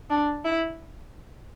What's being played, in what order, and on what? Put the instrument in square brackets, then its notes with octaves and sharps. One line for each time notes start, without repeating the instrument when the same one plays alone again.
[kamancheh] D4
E4